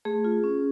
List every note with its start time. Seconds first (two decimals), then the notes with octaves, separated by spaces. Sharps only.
0.05 A3 G#4
0.25 F4
0.44 C#4